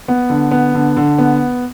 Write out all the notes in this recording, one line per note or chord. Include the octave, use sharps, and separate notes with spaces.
B3
D3
B3
D3
D3
B3